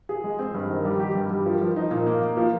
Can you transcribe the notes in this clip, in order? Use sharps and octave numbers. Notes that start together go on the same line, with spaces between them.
G#4
G#3
C4
G2
D#3
G3
G4
G2
G3
F3
F3
D#4
A#2
A#3
A#3
F3